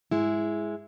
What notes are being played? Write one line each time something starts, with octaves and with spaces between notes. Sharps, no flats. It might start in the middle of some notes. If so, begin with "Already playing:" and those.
G#2 G#3 E4